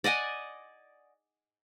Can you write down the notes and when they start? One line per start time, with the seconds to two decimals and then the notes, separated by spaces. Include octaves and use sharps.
0.04 D5 D#5 F#5 G#5